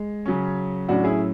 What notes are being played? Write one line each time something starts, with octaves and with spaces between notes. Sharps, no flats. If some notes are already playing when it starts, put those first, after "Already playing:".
Already playing: G#3
C#3 F#3 C#4
A2 F#3 C#4 D4 F#4
E4 G#4